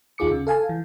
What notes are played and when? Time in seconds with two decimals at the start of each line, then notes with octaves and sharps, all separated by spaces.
0.18 D#2 D#4 F4 G#4 D6 C#7
0.31 C#3
0.47 A4 F5 G#5 A5
0.69 E3